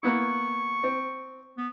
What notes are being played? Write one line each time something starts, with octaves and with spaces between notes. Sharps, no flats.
A#3 B3 E4 C#6
C4
B3